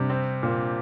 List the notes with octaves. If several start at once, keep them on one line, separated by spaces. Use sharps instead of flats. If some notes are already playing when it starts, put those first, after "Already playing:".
Already playing: C3 G3
C4
A#2